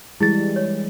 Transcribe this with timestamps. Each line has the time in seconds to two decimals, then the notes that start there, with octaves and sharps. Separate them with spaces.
0.21 E3 G3 G#3 E4 G#4 A6
0.56 C#5